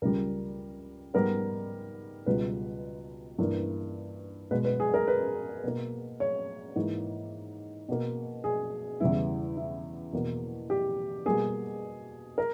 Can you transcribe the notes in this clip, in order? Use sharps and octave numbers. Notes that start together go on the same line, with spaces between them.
C#2 C#3 G3 A#4
G#2 G3 B3 A#4
C#2 B2 G3 B4
G2 E3 A#3
B2 G#3 B3 B4
B4
G#4
A#4
B4
B2 A#3
C#5
G#2 E3 A#3
B2 A#3
G#4
E2 C#3 G3 B3 E4
E4
E2 B2 A#3
G4
B2 G3 A#3 G#4
A#4